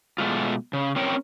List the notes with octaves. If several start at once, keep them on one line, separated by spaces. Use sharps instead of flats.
B2 G#3 A3 F4
C#3
C4 C#4 A#4 C#5 G5